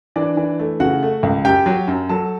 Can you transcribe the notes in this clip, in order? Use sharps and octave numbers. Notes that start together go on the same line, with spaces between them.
E3 D4 D5
E3
A3
C#3 F#4 F#5
A3
C#2
F#2 G4 G5
F#3
F#2
F#3 A4 A5